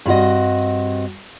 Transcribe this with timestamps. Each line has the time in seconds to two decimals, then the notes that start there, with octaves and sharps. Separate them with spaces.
0.06 G2 C4 F#4 D#5